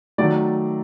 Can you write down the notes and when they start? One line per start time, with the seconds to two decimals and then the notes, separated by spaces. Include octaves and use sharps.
0.18 D#3 F#3 A3 D5